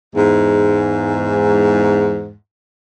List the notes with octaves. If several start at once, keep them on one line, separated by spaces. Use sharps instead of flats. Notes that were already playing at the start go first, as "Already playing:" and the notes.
E2 G#2